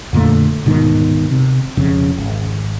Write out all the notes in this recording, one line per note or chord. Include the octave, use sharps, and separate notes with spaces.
F2 A#2 D3 A3
D1 G#2 B2 D#3
C3
E1 F2 C#3 C#4
G#1